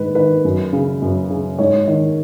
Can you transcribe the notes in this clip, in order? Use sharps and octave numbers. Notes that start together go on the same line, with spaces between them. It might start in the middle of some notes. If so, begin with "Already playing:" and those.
Already playing: G#2 D#3 B4
D#3 B4
F#2
C#3
F#2
C#3
G#2 C#5
D#3